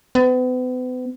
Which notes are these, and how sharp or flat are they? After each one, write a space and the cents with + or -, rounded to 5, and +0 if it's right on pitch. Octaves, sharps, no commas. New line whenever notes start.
B3 +40